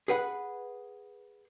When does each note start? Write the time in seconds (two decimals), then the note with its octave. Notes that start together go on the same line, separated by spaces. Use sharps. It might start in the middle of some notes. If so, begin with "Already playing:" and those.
0.08 G#4 B4 F#5